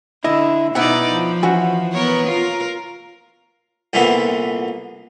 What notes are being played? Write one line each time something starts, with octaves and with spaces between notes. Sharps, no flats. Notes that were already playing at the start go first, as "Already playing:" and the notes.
D3 E4 D#5
B2 B3 D#4 E4 D5 F#5
F3
E3 C#4 F#4
B3 A#4 C#5
F4 A#4
C2 A#2 D3 E3 B3